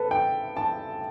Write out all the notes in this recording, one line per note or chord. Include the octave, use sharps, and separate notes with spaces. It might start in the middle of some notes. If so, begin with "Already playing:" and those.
Already playing: A4 B4
G5
A5